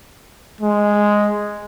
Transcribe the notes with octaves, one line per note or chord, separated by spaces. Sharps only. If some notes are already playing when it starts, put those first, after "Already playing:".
G#3